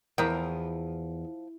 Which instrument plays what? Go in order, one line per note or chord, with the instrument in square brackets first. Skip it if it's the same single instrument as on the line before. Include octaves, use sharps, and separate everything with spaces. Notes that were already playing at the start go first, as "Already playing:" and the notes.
[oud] E2 [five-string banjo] F3 A#4 G5